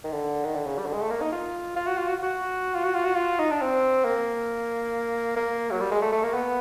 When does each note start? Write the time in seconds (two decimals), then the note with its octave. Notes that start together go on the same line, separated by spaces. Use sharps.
0.04 D#3
0.12 D3
0.44 D#3
0.55 D3
0.66 C#3
0.78 G3
0.86 D3
0.93 G#3
1.02 A3
1.11 A#3
1.21 D#4
1.32 F4
1.76 F4
1.87 F#4
1.98 F4
2.08 F#4
2.23 F#4
2.75 F4
2.84 F#4
2.95 F4
3.05 F#4
3.15 F4
3.39 D#4
3.51 D4
3.61 C4
4.05 A#3
5.37 A#3
5.71 F#3
5.81 G3
5.91 G#3
6.02 A3
6.12 A3
6.23 A#3
6.34 B3